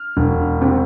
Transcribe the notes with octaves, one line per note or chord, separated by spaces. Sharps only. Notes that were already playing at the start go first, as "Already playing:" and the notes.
Already playing: F6
E1
C3